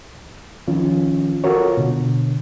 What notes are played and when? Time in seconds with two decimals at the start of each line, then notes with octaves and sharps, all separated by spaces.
0.67 D#3 F3 C#4 F4
1.44 F4 F#4 A4 A#4 C#5
1.77 B2 D3